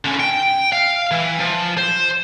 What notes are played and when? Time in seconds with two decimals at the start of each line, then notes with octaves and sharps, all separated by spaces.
0.05 D3 C#4
0.20 G5
0.72 F5
1.11 E3
1.40 F3
1.78 C5